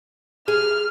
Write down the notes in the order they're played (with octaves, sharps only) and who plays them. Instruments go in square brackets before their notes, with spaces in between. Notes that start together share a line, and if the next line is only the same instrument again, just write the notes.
[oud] G#4 [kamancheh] F6